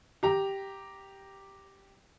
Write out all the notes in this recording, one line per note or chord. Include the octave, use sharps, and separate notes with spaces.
G4 A#5